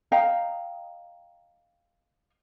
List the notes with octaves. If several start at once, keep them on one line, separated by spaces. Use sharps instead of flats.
D#5 F5 G5 A#5